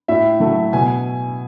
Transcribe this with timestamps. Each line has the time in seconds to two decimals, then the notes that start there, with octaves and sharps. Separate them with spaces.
0.08 A2 E5
0.40 F#3 A3
0.73 B2 G#5